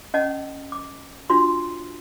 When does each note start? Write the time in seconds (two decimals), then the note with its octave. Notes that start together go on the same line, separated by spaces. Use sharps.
0.14 C#4 D#5 F#5 A5
0.72 D6
1.30 D4 F4 F#4 C6